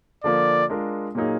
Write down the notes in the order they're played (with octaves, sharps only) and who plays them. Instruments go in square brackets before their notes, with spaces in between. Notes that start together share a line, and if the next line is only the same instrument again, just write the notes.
[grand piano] D3 F3 A#3 [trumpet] D5
[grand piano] G#3 D4 F4 A#4
A#2 F#3 A#3 D#4 G#4